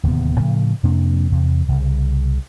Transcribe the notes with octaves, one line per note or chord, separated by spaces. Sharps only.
D1 D#2 C3 B3
A2 C#3 F3
F2 C3 A#3 D4
E2 C3
C2 C#3